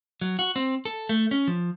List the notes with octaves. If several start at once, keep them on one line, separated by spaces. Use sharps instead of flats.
F#3
F#4
C4
A4
A3
C#4
F3